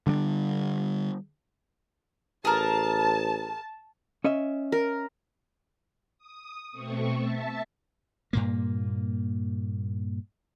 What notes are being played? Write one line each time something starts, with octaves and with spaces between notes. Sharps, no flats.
D3 G3 A#3 D4
A1 G#4 A#4 A5
C#4 D#5 E5
A#4
D#6
B2 A3 C4 C#6
E5 A5
G2 A#2 A#3